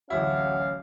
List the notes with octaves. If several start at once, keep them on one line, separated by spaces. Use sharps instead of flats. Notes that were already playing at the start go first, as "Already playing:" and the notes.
D1 A1 C#4 E4 F#4 F5